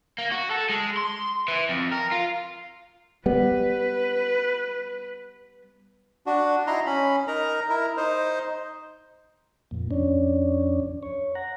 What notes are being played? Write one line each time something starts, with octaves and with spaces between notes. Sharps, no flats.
A#3
F#4
A4
G#3
C6
E3
F2
A#4
F4
G3 B3 B4
D4 F#4
D#4 E4 A#5 C6
C#4 B5
D#4 A#4 A#5
E4 A#4
D#4 C5
F2 A#2
F2 C#4 D4
C#5
F#5 A#5